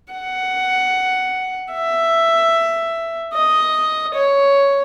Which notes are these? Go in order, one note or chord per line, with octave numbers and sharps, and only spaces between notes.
F#5
E5
D#5
C#5